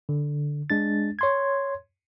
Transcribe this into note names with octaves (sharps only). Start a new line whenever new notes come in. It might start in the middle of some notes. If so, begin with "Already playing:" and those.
D3
G#3 D4 A6
C#5 C6 G#6